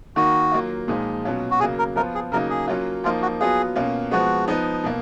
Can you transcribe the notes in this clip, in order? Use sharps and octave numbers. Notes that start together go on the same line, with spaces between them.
D#3 A#3 D#4 F#4
F#3 A#3 F4
A#2 F3 G#3 D#4
B2 F#3 C#4 F4
F#4
C#3 F#3 A#3 G#4
A#4
F3 B3 F4 A#4
G#4
C#3 F#3 A#3 D#4 A#4
G#4
F#3 A#3 C#4 F4
F3 A#3 D#4 F4
F#4
F#3 B3 F4 G#4
B2 A#3 C#4 F4
F3 G#3 B3 F#4
F3 B3 D#4
B2 A#3